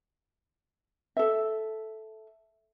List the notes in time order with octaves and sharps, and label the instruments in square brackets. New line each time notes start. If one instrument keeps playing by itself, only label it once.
[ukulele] A4 E5